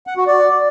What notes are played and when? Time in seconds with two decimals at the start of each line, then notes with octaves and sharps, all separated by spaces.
0.07 F#5
0.17 F#4
0.27 D5